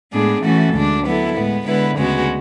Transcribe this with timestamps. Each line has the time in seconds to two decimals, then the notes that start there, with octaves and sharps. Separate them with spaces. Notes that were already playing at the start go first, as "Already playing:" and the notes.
0.12 A2 G#3 B3 D4 G#4
0.43 E3 A3 C#4 F#4 A4
0.74 D2 D3 G#3 D4
1.04 F#3 B3 E4 A4
1.36 A2 G#3 B3
1.66 D3 G#3 B3 E4 B4
1.97 D2 C#3 G#3 B3 F#4